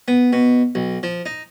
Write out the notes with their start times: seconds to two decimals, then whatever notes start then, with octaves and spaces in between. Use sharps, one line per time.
0.08 B3
0.33 B2
0.75 B1
1.03 F3
1.26 D#4